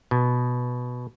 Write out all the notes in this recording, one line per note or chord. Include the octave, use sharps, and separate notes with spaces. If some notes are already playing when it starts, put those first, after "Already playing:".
B2